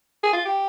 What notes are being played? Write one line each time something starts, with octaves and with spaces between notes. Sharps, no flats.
G#4
F4
G4